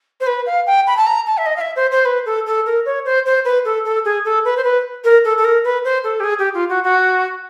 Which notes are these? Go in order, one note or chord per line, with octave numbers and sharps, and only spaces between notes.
C5
B4
F5
G5
B5
A5
A#5
A5
E5
D#5
F5
E5
C5
C5
B4
A4
A4
A#4
C#5
C5
C5
B4
A4
A4
G#4
A4
B4
C5
B4
A#4
A4
A4
A#4
B4
C5
A4
G4
G#4
G4
F4
F#4
F#4